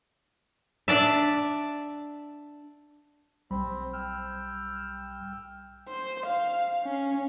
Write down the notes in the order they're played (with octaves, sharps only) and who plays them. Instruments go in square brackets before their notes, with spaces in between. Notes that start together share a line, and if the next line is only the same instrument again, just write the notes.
[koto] D4 D5 E5
[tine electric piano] B1 G3 B5 [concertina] C4
[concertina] G5 E6 F6
[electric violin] C5
F5
C#4